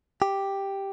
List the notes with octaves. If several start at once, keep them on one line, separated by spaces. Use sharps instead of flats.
G4